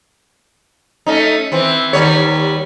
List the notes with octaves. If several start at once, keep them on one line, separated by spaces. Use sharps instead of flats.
A3 C#4 D#4
E3 C4
D#2 G3 C#5